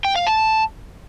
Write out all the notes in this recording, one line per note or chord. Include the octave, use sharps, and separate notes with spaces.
G5
F5
A5